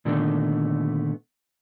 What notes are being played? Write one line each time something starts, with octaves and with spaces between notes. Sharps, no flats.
A#2 D3 D#3 A3 B3